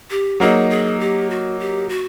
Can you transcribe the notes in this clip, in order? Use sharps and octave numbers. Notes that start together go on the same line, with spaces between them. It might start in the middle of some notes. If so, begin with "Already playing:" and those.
G4
F#3 A#3 D#4 G#4
G#4
G4
F#4
G4
F#4